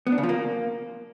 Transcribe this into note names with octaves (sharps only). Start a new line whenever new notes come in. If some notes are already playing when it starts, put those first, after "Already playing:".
B3
D4
C#3
F3
A#3